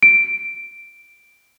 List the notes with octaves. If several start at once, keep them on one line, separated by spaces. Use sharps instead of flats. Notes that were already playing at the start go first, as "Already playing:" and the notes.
D7